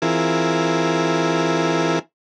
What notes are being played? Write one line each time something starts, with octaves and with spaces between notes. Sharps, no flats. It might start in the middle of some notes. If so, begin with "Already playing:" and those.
E3 C4 E4 F4 G#4 A#4